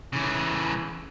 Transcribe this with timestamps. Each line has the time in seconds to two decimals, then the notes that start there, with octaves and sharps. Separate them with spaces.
0.13 C#3 E3